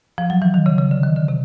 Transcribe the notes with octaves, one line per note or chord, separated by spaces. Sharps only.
F3
F#3
E3
D#3
C#3
C#3
D3
D#3
D3
C3